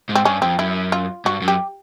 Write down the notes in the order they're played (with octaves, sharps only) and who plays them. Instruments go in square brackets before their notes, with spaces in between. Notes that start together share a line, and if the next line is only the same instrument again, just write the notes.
[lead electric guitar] G#2
[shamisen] C4
[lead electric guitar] G2 [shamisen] C#4
[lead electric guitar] F2 [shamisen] C4
[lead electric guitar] F#2 [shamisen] E4
[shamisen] F4
[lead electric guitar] G2 [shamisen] F#4
[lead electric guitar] F#2
[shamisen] G4